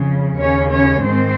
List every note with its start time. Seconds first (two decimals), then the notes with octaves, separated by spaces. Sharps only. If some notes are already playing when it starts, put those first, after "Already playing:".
Already playing: F2 C#3
0.39 D#2 C#3 C#4 C#5
0.71 C#4 C#5
1.03 G#2 D#3 C4 C5